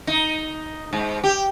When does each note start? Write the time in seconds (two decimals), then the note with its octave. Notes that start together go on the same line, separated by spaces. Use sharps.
0.07 D#4
0.93 G#2
1.24 G4